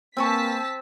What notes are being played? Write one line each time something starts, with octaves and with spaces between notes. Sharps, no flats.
A#3 C4 B4 G#5 A5 C#6 B6